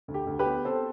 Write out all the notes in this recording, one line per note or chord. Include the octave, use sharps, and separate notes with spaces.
D2
G4
D2
G4 B4
B3
C4 A4 C5